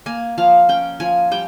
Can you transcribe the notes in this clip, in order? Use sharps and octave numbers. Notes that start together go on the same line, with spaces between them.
A#3 G#5
F3 F5
C#4 G5
F3 G#5
G3 G5